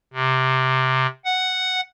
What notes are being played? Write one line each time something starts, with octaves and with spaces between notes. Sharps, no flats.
C3
F#5